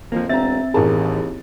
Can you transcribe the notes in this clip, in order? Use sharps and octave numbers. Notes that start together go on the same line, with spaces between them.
F2 F3 A#3
E1 C4 E5 A#5 A6
A1 D#2 G#4 A#4 A5 C#6